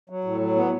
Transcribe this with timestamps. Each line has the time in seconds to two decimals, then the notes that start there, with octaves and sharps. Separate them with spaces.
0.10 F#3
0.24 A2
0.40 F#3
0.56 B3